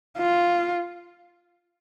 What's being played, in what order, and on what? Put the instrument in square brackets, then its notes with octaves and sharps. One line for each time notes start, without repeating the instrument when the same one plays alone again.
[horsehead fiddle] F4